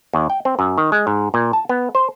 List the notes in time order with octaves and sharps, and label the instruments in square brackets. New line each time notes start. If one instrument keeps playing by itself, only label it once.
[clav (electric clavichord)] D#2
G5
C4
F#2
D#3
G#3
G#2
A#2
A5
B3
C5